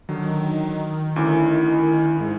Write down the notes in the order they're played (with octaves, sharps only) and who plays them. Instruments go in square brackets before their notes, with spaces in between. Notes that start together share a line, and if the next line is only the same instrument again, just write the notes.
[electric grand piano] D3 F#3 [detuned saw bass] D#3
[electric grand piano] D2 C#4 D6 [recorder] E4
[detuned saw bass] G#2 [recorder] G#3